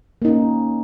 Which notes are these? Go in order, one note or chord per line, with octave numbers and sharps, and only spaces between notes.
A#3 C#4 D#4